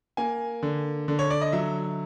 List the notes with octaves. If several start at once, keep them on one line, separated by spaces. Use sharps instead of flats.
A#3 G#5
D3
D3
C#5
D5
D#5
F#3 E5